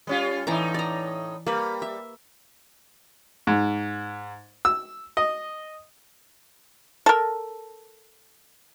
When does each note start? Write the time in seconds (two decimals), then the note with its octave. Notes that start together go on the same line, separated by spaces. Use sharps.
0.07 G3 C#4 F4
0.47 A2 E3 D#4 D5 A#5
0.74 D5 A#5
1.46 G3 A#3 B4
1.82 E5
3.47 G#2
4.65 E6
5.17 D#5
7.06 A4 A#4